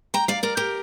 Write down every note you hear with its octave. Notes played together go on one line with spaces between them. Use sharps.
G5 A#5
D5 F5
A#4 D5
G4 A#4